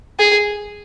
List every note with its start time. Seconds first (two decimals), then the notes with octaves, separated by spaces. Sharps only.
0.19 G#4